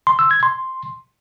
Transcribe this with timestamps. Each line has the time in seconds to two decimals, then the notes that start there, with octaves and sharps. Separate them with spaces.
0.07 C6
0.19 E6
0.31 G#6
0.43 C6